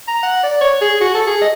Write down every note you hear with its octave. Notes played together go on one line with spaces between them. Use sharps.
A#5
F#5
D5
C#5
G#4
F#4
A4
G#4
D#5